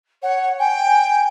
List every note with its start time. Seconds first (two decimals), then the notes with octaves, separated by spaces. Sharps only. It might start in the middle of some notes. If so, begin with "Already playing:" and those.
0.22 C#5 F#5
0.59 G5 G#5